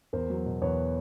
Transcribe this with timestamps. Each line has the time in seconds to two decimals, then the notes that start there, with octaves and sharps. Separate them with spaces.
0.13 E2 A#4 C5
0.30 F#3
0.46 B2
0.62 E2 B4 C#5